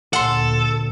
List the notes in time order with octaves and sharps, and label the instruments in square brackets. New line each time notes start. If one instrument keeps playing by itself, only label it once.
[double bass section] D2 A#2 [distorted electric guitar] A4 [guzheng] F#5 C6